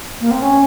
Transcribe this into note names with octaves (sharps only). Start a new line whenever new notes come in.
A#3
C4
C#4